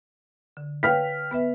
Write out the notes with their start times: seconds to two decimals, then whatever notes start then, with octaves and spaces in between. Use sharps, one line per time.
0.57 D3
0.83 B4 C#5 F5 G5 F6 B6
1.31 B3 B4 E5